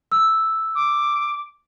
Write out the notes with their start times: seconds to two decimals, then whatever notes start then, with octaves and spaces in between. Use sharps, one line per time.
0.12 E6
0.75 D6